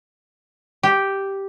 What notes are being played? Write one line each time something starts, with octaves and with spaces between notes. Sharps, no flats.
G4